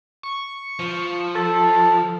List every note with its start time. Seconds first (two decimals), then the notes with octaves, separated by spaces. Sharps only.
0.23 C#6
0.79 F3
1.35 A4